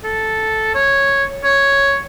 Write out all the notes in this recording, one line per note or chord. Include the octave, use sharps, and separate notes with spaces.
A4
C#5
C#5